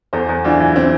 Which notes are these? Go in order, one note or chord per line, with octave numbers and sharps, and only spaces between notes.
E2 A4 C5
E2
E3 D4 F4
E3
C4 E4